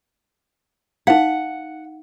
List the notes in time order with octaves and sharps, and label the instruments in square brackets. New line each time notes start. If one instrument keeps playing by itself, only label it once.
[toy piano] D#4 F5 [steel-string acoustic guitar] F#5